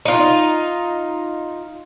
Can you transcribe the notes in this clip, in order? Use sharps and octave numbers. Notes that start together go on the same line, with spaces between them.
D#4 F4